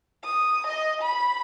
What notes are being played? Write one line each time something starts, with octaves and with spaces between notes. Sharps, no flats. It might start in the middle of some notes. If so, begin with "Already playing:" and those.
D#6
D#5
B5